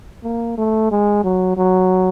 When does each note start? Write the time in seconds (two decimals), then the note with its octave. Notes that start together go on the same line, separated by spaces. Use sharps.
0.23 A#3
0.57 A3
0.91 G#3
1.24 F#3
1.57 F#3